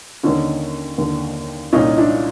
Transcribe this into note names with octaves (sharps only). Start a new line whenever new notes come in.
D#2 D3 C#4 D#4
D#2 D3
C2 A#2 C#4 D#4
D4 E4